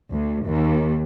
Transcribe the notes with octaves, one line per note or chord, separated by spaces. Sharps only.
D2
D#2